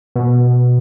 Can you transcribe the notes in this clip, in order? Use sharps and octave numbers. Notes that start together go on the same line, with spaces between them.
B2